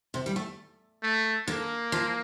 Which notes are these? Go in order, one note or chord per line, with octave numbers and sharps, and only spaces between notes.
C3
G3
A3
A3
D3 A#3
F3